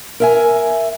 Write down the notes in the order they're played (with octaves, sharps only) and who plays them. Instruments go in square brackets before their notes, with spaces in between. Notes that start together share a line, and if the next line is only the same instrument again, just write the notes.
[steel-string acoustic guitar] A#4 E5 G#5